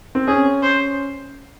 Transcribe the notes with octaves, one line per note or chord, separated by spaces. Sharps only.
C4
C#4 G#4
C5